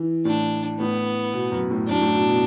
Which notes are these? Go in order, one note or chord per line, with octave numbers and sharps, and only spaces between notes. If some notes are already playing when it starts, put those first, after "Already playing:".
Already playing: E3
A2 D4
A2 B3
B2
F#2
A2
F#2 D4
A2
B2
B2